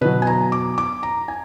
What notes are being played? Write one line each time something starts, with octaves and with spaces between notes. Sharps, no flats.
B2 F#3 B4
G#5
A#5
D6
D6
A#5
G#5